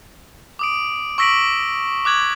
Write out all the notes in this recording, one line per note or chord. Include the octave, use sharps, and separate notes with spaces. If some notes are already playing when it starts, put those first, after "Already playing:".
D6 D#6 D7
C#6 E6 A#6 B6 D7 F#7
D6 F#6 G#6 F#7